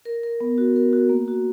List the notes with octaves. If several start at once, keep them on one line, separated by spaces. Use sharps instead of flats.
A#4
A#4
B3
F#4
A#4
F#4
A#3
F#4